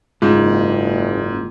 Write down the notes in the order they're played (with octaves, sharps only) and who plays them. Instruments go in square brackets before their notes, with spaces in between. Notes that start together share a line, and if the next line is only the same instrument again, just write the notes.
[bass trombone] F#1 [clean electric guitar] D#2 C#3 [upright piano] G#2 [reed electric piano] F4